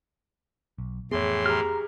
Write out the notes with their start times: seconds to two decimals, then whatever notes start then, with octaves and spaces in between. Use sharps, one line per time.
0.78 B1
1.11 F2 A2 E3 B3 G#4 C#5 C6
1.46 G4 G#4 A#5 F6